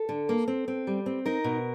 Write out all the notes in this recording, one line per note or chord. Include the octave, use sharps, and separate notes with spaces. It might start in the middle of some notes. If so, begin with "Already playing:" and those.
Already playing: A4
D3
A#3
C4
C4
G3
C4
D#4 A#4
B2